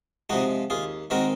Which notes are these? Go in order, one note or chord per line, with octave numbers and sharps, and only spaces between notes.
C3 F3 G#3 D#4 F#4
D#2 F4 G#4
D#3 G#3 C4 F#4 A#4